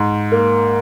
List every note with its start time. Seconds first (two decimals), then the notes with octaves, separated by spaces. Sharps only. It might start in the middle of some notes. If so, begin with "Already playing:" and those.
Already playing: G#2
0.32 A#3